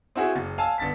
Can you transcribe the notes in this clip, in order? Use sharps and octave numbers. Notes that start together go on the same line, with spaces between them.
C4 E4 F#4 G#4
F#1
F5 G#5 A5 E6
G1 D4 A6 B6